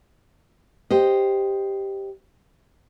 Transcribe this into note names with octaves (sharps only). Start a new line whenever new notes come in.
G4 C5 D#5